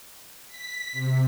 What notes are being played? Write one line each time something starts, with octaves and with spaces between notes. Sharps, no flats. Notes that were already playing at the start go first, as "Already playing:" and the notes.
B6
C3